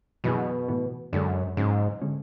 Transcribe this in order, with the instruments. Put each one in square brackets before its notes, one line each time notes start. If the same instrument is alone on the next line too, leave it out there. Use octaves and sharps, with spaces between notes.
[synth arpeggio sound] F#2 E3 B3 E4 G#4 [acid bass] B2
[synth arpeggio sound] A2 E3 B3
[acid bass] F#2 [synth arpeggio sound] D3 G#3 D4 A4
[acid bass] G#2 [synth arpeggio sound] C#3 F#3 C#4
[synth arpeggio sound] D3 G#3 C#4